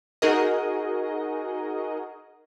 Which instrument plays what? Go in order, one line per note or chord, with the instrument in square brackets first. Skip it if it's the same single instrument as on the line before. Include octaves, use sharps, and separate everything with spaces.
[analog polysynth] D#4 F#4 G#4 A#4 D#5